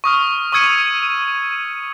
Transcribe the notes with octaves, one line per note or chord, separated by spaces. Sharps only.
C#6 D#6 F6
C#6 D#6 E6 G#6 C#7 D#7